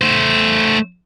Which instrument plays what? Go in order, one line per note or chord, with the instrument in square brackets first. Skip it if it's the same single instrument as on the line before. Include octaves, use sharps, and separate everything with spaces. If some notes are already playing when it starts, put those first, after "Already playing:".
[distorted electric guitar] A3 C5